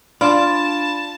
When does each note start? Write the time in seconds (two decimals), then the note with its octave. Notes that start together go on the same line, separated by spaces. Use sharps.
0.21 D4 F4 D5 A5 B5